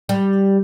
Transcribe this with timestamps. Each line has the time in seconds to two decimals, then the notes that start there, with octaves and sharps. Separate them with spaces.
0.09 G3